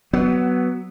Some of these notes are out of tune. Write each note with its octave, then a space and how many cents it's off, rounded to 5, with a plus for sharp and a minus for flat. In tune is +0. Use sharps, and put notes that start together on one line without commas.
F#3 +20 B3 +0